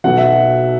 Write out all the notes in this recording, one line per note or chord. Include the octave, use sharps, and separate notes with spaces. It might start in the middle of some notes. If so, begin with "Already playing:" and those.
B1 B2 F#3 F#5
E5